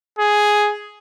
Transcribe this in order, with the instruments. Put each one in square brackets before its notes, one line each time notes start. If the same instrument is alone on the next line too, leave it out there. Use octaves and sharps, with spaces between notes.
[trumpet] G#4